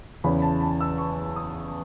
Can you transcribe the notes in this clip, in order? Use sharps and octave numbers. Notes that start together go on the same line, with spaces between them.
E2 C#3 E3 B5
A5
A5
E6
C#6
D#6